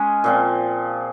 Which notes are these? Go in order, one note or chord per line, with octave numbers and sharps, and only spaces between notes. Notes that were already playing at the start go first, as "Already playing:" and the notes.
Already playing: G#3 C#4 G#4
A#2 F3 C4